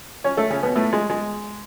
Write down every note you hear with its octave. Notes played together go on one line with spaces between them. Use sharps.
C#4 C#5
A3 A4
C#3 C#4
B2 B3
A2 A3
G#3
G#3